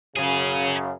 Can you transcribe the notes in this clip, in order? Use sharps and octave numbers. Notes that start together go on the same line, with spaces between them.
F#2 C#3 C#4 G#4